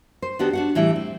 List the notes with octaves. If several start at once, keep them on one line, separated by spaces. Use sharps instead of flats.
C5
D#3 B3 D4 F#4 G4
D4 F#4 F#5
A2 E3 G3 E4
C4